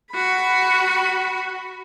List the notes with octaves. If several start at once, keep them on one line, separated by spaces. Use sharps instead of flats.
F#4 B5